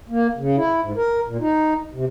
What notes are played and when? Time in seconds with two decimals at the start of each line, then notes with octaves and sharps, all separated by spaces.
0.10 A#3
0.38 C#3
0.57 E4
0.82 G#2
0.97 A#4
1.28 A#2
1.40 D#4
1.94 C3